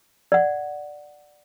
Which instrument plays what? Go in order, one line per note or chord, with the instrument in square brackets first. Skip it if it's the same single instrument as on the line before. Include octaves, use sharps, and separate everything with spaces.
[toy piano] D5 F#5